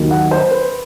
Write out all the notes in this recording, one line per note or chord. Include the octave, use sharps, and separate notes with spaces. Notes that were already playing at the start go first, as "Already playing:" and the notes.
Already playing: D#2 D#3 F#3
F#5
C5
B4